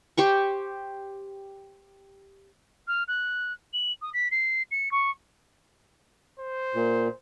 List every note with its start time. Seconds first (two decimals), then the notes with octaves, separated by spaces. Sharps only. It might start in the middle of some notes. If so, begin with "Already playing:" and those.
0.17 G4 C5 C#6
2.87 F6
3.08 F#6
3.73 F#7
4.02 D#6
4.13 B6
4.31 C7
4.71 C#7
4.91 C#6
6.39 C5
6.75 A#2